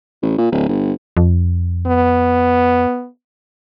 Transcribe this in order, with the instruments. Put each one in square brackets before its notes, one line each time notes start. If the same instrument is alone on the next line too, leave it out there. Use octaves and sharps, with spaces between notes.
[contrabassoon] A1
A#2
D1
G1
[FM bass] F2
[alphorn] B3